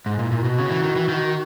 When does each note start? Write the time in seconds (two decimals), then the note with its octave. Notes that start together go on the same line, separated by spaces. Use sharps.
0.06 G#2 G#3
0.19 A#2
0.23 E4
0.32 A#2
0.41 B2 F#4
0.58 C#3
0.70 E3
0.83 D#3
0.96 E3
1.09 D#3